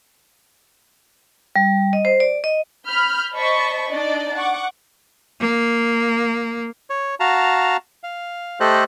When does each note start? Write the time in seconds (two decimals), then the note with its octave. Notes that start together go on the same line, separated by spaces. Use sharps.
1.56 G3
1.93 D#5
2.05 C5
2.20 D5
2.44 D#5
2.87 B5 F6 G6
3.34 C5 D5 D#5 A5 B5 C#6
3.88 D4 D#4 D5 D#5
4.35 F#5 C#6 D6
5.41 A#3
6.90 C#5
7.20 F#4 F5 A5 A#5
8.03 F5
8.60 A3 G4 A4 C5 D#5 F#6